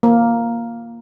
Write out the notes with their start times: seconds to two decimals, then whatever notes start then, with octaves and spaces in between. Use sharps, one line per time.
0.03 A#3